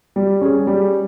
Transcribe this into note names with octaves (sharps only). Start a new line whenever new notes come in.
G3
C#4 G#4
G3